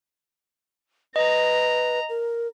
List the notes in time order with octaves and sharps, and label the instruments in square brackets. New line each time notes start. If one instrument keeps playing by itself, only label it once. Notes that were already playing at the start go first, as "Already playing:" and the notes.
[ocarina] B4 [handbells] D#5 [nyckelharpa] A#5
[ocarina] A#4